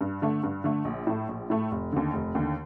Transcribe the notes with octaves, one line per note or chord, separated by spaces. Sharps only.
G2
D3 A3
G2
D3 A3
A#1
A2 A3
A#1
A2 A3
F1
D#2 D3
F1
D#2 D3